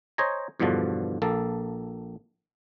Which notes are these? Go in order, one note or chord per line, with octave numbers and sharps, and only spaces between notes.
C5 C#5 D#5 G#5 A#5
E2 G2 B2 D3 F3
A#1 A#3 A4